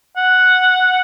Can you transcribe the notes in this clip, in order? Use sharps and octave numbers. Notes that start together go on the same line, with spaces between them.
F#5